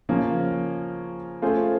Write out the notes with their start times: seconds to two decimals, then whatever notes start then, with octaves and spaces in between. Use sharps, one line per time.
0.09 C#3 F3 A#3 C#4 F4
1.42 A3 C#4 F4 G#4 C5